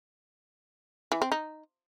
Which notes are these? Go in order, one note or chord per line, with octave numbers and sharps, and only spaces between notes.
E3
C4
D#4